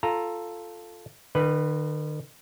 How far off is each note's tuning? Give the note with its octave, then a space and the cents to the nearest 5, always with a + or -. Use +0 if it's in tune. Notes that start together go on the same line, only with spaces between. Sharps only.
F4 +0 A4 +0 A#5 +0
D#3 -45 B4 +0